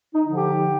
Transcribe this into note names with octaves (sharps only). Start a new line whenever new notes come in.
D#4
D3 F3
G4